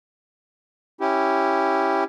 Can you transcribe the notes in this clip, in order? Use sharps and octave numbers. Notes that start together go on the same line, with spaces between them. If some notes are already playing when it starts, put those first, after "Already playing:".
C#4 E4 G4